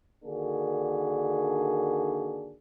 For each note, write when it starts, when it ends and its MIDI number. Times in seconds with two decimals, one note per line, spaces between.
0.25 2.56 50
0.25 2.56 51
0.25 2.56 58
0.25 2.56 62
0.25 2.56 66
0.25 2.56 68